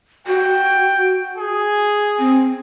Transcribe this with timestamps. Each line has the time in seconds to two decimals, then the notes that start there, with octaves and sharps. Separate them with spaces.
0.27 F#4 G5
1.38 G#4
2.19 C4